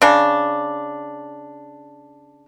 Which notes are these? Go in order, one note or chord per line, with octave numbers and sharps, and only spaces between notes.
C#3 D4